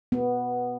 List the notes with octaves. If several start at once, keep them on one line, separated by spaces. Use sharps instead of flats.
B3